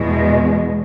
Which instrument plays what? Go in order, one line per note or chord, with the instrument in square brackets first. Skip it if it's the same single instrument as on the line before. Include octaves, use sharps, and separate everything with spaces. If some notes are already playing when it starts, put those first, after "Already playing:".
Already playing: [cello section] E2 B2 G#3